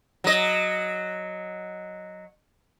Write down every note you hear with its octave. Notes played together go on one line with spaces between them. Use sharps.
F#3 D#5